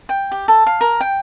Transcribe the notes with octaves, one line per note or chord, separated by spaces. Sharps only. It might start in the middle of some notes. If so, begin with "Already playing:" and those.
G5
G4
A4
F5
A#4
G5